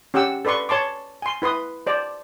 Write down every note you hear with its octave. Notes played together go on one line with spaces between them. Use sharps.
C#4 G4 F#5 G5 E6
A4 B4 D5 C6 C#6
C#5 A5 C6 D6
G#5 C6
E4 B4 C6 D#6
C5 D5